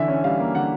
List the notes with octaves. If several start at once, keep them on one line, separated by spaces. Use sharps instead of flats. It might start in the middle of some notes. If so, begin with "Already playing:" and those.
Already playing: D3 E3 E5
C#4
G3 F5
A#3
D3 F#5